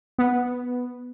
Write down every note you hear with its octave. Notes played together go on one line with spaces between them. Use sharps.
B3